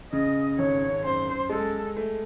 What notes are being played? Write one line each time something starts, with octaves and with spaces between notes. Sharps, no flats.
C#3 D#5
G#1 C#5
F#2 C5
G#3 A4
A3